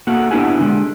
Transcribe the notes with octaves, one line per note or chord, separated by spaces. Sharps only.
A3 A#3 F#4 F#5
B3 D4 E4 G4 F#5 G#5
D3 G3 G#3